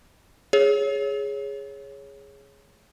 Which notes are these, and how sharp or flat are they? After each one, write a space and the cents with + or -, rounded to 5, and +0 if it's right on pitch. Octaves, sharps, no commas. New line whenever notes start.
G#4 +0 C#5 +0